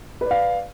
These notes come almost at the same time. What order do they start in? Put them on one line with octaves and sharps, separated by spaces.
B4 D5 F5